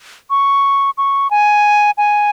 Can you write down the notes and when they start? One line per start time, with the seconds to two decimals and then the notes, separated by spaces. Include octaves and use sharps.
0.30 C#6
0.98 C#6
1.31 G#5
1.98 G#5